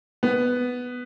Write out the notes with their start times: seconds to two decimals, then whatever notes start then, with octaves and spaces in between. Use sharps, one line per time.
0.23 B3